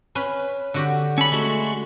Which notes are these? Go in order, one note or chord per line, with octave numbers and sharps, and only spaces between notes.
C#4 B4
D3 F#4 G4
C#4 A4 B5
G#3 A3 F#4